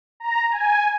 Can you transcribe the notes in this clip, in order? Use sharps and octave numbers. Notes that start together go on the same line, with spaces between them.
A#5
G#5